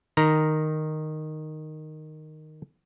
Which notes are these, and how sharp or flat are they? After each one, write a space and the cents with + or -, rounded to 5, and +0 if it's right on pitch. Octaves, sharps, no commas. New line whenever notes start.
D#3 -5 A#5 +0